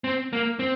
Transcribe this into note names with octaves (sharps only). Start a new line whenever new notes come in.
C4
A#3
C4